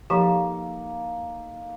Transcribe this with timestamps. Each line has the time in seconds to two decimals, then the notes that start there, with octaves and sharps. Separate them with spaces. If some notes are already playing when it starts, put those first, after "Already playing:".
0.10 F3 A#3 D#4 G4 A4